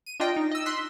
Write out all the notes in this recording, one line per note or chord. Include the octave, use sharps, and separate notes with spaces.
D#7
D4 F4 D#5 G5
D#4
D#5 E6
C6 E6 F#6 B6